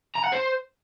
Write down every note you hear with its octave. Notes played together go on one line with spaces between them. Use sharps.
A#5
F#5
C5